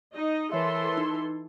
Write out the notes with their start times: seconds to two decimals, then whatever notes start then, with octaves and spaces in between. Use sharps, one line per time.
0.14 D#4 D#5
0.52 E3 A4 A#4 C#5 E5 C6
0.97 D#4